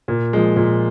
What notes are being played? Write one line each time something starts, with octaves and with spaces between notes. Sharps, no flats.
A#2
F3 G#3
A#2